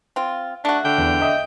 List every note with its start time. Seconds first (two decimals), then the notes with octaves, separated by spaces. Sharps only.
0.16 C4 F4
0.65 A3 D4 F#4
0.85 D3 G5
0.98 E2
1.21 D#5 E5 D#6